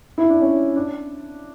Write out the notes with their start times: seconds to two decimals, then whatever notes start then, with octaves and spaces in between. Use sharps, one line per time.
0.18 E4
0.29 D4
0.41 C#4
0.76 D4